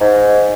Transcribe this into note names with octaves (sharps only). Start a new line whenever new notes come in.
G#2